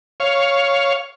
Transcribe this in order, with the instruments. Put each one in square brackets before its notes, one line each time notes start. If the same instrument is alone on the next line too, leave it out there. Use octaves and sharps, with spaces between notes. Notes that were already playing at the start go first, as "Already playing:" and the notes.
[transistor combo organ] C#5 F5